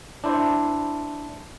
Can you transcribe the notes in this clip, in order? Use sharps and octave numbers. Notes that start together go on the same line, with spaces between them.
D4 E4 C5